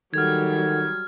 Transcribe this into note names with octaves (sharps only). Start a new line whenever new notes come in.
D#3 F#3 G3 A4 F#5 F6 G#6